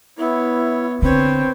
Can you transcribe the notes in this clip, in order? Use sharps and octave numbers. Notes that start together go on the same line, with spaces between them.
B3 E4 C#5
D3 C4 B4 C#5